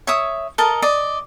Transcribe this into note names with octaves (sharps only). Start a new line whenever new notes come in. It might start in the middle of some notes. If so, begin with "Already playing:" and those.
C#5 E5 D#6
A4 A#4 D#5 A5
D5 D#5